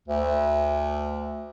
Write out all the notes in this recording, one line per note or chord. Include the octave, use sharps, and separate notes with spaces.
D2